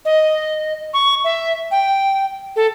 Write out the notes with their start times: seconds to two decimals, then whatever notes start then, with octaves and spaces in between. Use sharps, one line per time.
0.05 D#5
0.94 C#6
1.24 E5
1.71 G5
2.56 A4